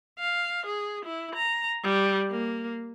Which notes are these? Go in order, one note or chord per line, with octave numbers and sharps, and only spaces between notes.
F5
G#4
E4
A#5
G3
A#3